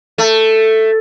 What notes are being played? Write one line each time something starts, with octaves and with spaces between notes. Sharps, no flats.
A3